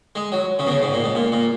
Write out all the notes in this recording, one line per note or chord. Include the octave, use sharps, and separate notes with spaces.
G#3
F#3
C#3
B2
C#3
G#2
A#2
G#2
A#2
A#2